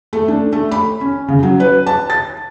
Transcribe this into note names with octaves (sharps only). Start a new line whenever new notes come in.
A3
D4
A3
B5
C#4
C#3
F#3
B4
A5
A6